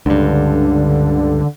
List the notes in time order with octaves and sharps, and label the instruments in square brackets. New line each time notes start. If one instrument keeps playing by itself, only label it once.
[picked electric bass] C#2 G2 [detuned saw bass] D3